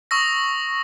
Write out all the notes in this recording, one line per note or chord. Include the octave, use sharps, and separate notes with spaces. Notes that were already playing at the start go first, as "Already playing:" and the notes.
C#6 D#6 E6 A#6